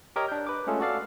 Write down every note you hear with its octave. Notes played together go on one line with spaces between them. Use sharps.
G4 A#4 C#5 D#5
D4 G6
B4 D6
G#3 A3 C#4 F4 G#4 A4
F#4 A4 D5 F5